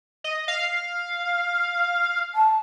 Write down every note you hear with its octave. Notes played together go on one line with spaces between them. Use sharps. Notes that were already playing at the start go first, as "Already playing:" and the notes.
D#5
F5
A5